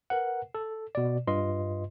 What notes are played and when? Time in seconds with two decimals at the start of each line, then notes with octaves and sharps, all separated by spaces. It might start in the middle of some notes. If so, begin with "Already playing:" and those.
0.10 A#4 B4 F#5
0.55 A4
0.95 B2 D5
1.27 G2 F4 B4 D#5 C6